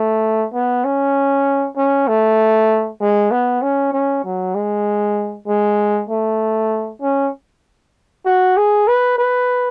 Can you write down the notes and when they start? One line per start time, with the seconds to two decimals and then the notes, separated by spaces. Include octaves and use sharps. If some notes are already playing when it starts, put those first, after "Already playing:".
Already playing: A3
0.54 B3
0.84 C#4
1.77 C#4
2.08 A3
3.01 G#3
3.31 B3
3.62 C#4
3.93 C#4
4.25 F#3
4.55 G#3
5.48 G#3
6.10 A3
7.02 C#4
8.26 F#4
8.57 G#4
8.88 B4
9.18 B4